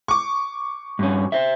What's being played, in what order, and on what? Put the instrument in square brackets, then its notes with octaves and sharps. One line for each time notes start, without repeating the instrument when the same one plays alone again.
[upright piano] C#6 D6
[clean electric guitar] G2 C#4
C5 E5